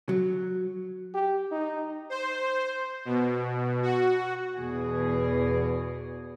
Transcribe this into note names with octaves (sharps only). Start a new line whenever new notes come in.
F#3
G4
D#4
C5
B2
F#4
E2 B2 G#4